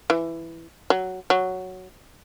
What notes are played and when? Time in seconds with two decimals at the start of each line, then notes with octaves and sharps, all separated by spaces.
0.10 E3
0.90 F#3
1.30 F#3